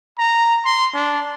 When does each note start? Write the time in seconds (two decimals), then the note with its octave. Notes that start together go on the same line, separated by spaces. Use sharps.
0.18 A#5
0.65 C6
0.94 D4